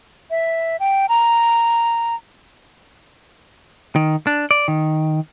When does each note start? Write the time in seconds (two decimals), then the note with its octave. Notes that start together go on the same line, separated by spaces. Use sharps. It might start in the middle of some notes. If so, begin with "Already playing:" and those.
0.30 E5
0.80 G5
1.09 A#5
3.96 D#3
4.27 D4
4.51 D5
4.68 D#3